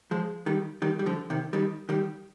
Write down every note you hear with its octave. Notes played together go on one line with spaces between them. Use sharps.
F3 G#3
D#3 G3
D#3 G3
G3
D3 F3
C3 D#3
D#3 G3
D#3 G3